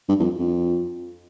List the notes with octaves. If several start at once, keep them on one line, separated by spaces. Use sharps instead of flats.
G2
E2
F2
F2